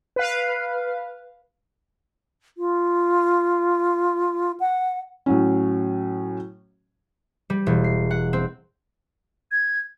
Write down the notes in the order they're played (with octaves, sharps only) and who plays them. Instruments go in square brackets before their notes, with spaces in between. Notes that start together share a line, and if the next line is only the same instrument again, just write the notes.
[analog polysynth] B4 F5
[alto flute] F4
F#5
[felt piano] A2 F#3 C#4
[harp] G3
E1
C7
F#5
C4
[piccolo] G#6